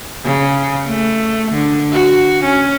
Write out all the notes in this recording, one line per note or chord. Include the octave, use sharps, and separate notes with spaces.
C#3
A3
D3
F#4
C#4